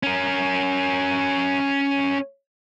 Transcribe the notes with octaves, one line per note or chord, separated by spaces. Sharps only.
C#4 A#4